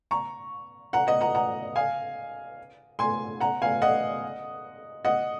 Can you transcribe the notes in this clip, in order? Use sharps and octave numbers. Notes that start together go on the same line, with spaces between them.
A#5 C#6
F#5 A#5
D#5 F#5
F#5 A#5
F#5 A#5
F5 G#5
G#5 C6
F#5 A#5
F5 G#5
D#5 F#5
D#5 F#5